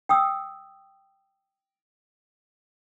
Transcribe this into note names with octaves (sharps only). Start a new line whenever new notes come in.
G5 D#6 E6